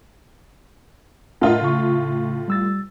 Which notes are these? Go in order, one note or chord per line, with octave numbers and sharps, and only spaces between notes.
A2 F4 A#4 D#5 F#5
C#3 C#6
G3 E6 A6